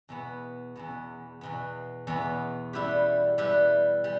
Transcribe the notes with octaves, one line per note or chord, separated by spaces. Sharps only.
E2 B2 B3
E2 B2 B3
E2 B2 B3
E2 B2 B3
G3 E4 G4 B4
G3 E4 G4 B4
G3